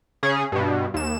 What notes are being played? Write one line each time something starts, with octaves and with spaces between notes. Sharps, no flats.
C#3 C#4 G#4
G2 B2
D#2 E7